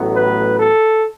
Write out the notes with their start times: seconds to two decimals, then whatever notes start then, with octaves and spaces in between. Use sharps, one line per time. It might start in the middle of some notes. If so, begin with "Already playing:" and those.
Already playing: A1 A2 F#3 B3
0.16 B4
0.60 A4